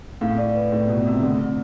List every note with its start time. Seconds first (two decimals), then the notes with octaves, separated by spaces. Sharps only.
0.21 A2 F5
0.38 D5
0.55 B4
0.72 A2 D5
0.88 B2 F4
1.05 C3 F4
1.22 D3 A3
1.39 C4